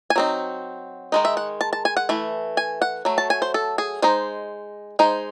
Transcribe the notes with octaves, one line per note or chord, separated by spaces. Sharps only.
G#5
F#3 C4 D#4
D#3 G#3 D#4
E5
F#5
A5
A5
G#5
F#5
E3 A3
G#5
F#5
F#3 A3
A5
G#5
C5
A4
G#4
G#3 D#4 C5
G#3 D#4 C5